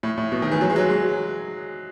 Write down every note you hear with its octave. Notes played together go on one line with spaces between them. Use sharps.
A2
A2
B2
D#3
E3
F#3
G#3
F#3
G#3